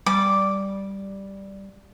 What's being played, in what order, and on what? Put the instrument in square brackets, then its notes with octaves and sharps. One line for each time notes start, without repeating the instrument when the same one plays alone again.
[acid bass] G3 [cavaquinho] D6